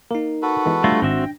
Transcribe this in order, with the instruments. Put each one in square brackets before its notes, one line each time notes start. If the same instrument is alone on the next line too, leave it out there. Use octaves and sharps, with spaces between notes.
[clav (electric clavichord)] A#3 [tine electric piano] D#4 A#4
[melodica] F#4 A4 B4
[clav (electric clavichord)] E3 G#3 B3
[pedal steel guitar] G3 A3 F4 [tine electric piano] D4 A#6
[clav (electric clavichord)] G#1 [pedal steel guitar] C4 F#4 E5 [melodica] G5